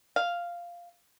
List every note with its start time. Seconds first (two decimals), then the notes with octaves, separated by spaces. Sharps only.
0.16 F5